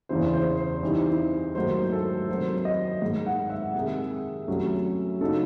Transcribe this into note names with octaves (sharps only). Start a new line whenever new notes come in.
E2 C#3 E3 C5
C5
C5
C2 C3 E3 C4 D#4
G#2 D#3 F#3 A3 C5
A4
C3 D#3 F#3 C5
D#5
G#2 D#3 G#3
F#5
E5
C3 D#3 G#3
C2 C3 F#3 A3 C#4
C#3 F#3 A3 D#4 A4